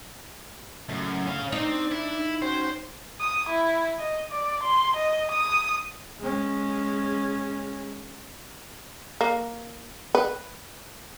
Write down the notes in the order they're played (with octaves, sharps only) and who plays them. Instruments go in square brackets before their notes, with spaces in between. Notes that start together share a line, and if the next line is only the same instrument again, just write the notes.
[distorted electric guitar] F#2 [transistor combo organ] A2 C#3
[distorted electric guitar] C#4 F5
[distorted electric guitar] C4 [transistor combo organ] D4 [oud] D#4
[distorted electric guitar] E4
[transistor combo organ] C#4 F#4 G5 [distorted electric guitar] C5
[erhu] D#6
E4
D#5
D5
C6
D#5
D#6
[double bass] G#3 C#4
[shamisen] A#3
B4